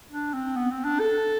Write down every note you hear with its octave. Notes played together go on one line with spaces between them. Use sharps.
D4
C4
B3
C4
D4
A4